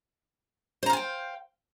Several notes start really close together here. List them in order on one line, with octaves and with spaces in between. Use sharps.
C5 A#5 F5 G#5 G5